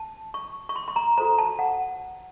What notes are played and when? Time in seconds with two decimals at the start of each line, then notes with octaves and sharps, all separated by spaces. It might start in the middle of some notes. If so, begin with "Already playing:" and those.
Already playing: A5
0.34 C#6
0.69 C#6
0.76 C6
0.88 C6
0.96 A#5
1.18 F#4 A4 C5 A#5
1.38 A5
1.59 F#5